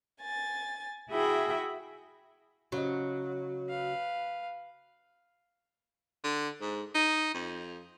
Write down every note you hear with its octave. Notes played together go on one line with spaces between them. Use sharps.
G#5 A6
E4 F#4 G#4 E5 G5 B5
C#3 F#3 D#5
B4 F5
D3
G#2
D#4
F2